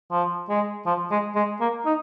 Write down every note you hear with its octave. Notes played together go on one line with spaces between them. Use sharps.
F3
G#3
F3
G#3
G#3
A#3
D#4